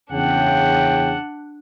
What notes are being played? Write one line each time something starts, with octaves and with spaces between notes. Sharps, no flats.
E2 C#3 D4 F#5 G5